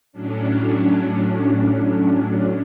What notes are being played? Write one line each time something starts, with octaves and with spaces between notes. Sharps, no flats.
A2 F#3 C#4 D4